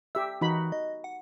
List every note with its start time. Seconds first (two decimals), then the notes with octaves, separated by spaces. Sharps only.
0.15 G4 E5 E6
0.41 E3 D#4 F#4 B5
0.72 D#5
1.04 F#5